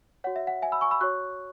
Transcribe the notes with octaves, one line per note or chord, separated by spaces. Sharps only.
F#4 C#5 F#5
E5
F#5
E5 G#5
B5 E6
G#5 C#6
B5 E6
F#4 C#5 C#6 F#6